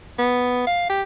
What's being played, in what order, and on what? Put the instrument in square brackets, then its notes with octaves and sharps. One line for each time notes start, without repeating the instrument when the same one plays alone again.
[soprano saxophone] B3
F5
G4